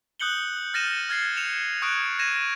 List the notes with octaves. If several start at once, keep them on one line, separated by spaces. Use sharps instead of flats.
D#6 F#6 G6 C#7 F#7 G7
F6 A6 A#6 C#7 D#7 E7
F6 G#6 A6 C7
C#7 E7 F7
C#6 D#6 F#6 G#6 D7
G#6 A#6 D#7 E7